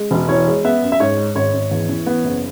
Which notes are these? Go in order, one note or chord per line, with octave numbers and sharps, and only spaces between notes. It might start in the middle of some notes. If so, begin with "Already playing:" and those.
Already playing: G#3
E1
E3 C#5
G#3
B3 E5
F#2
E5
G#2 C#5
G#3
G#1 C#5
G#1
E2
E3
B3
F#1